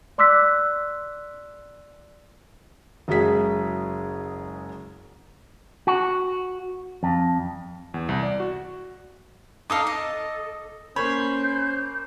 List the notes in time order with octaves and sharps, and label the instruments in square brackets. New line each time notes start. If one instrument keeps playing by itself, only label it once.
[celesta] D5 C6 D6 E6 F#6 B6
[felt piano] F#1 F#3 G#3 G#4 B6
[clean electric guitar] F#4
F2
[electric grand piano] E2
C2
D5
F#4
[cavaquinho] D#4 A4 F5 [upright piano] D6 D#6
[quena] A4 [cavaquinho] D#5
[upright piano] A#3 B5 [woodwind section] C#4 C5 [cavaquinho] C#5 [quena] G6